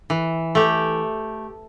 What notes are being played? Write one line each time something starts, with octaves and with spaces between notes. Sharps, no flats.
E3
A3 G4